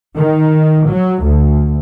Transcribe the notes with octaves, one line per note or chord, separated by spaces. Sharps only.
D#3
F#3
D2